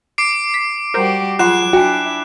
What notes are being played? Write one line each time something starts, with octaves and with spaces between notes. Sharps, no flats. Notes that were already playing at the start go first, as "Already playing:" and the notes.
D6 C7 D7
B6
G3 F#4 G4 A#4 C5
F#3 F4 G#4 F#5 C6 F#6 E7
D4 E4 F#4 G5 G#5